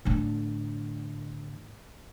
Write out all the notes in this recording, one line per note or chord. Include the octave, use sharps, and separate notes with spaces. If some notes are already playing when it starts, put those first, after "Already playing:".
A2 D3